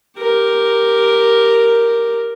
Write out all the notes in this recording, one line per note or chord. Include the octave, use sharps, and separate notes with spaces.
G4 A#4